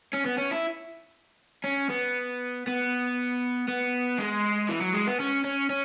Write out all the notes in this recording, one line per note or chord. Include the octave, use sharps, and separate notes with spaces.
C#4
B3
C#4
E4
C#4
B3
B3
B3
G#3
E3
F#3
G#3
B3
C#4
C#4
C#4